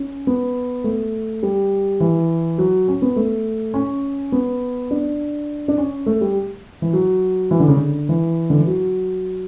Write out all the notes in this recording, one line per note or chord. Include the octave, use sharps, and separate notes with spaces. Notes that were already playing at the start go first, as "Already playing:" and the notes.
Already playing: C#4
B3
A3
G3
E3
F#3
C#4
B3
A3
C#4
B3
D4
D4
C#4
A3
G3
E3
F#3
E3
D3
C#3
D3
E3
D3
E3
F#3